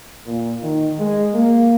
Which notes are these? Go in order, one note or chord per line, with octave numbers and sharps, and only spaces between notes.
A#2
D#3
G#3
A#3